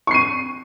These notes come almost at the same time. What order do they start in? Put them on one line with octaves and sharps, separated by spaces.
C#6 C7 D#7